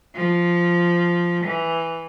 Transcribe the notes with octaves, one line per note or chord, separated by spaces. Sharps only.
F3
E3